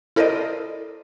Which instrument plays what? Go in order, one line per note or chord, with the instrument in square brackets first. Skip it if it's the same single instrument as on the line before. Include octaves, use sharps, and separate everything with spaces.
[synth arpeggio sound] E4 A4 A#4 C5 D5 D#5